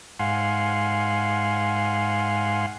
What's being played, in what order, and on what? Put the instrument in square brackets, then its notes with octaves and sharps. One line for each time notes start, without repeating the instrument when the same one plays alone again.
[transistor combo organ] G#2 F5 F#5 G#5 C6